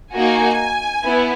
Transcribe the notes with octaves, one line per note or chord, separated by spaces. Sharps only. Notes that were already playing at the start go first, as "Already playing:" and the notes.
A#3 D#4 F#4 G#5
B3 E4